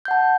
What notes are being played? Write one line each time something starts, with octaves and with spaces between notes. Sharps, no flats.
F#5 A5 G6